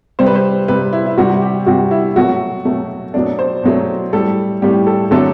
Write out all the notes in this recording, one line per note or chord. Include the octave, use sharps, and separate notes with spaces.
C3 G3 C5
B4
C5
C3 G3 B4
E4
E4
C3 G3 F#4
G4
C3 G3 F#4
E4
B2 F#3 A3 F#4
B2 F#3 A3
B2 F#3 A3 D4
C5
B2 F#3 A3
A2 G3 A4
A2 G3 G4
A4
D3 F#3 A3 A4